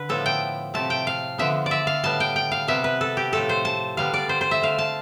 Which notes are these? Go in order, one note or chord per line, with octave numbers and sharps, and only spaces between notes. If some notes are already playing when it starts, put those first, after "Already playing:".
Already playing: D3 B4
A2 F3 B3 A4
G5
C3 F3 A3 A5
G5
F5
D3 F3 B3 E5
D5
E5
F5
A2 G3 B3 A5
G5
G5
F5
C3 G3 B3 E5
B4
A4
G4
A2 F3 A3 A4
C5
A5
D3 G3 B3 F5
D5
C5
C5
E5
D3 A3 F5
A5